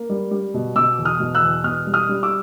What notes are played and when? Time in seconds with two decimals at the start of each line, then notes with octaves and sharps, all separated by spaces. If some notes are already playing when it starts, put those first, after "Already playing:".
Already playing: A#3
0.10 G3
0.31 G3
0.54 B2
0.75 B2 D6 E6
0.99 E2
1.05 D#6 F6
1.20 B2
1.35 E6 F#6
1.42 E2
1.64 B2 D#6 F6
1.87 G3
1.94 D#6 F6
2.09 G3
2.23 D6 E6